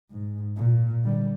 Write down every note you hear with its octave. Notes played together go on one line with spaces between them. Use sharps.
G#2
A#2
D3 G3